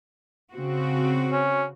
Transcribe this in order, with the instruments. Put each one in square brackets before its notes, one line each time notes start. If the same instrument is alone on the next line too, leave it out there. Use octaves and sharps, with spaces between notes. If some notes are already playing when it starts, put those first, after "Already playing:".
[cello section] C#3 C4 F#4
[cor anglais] C#4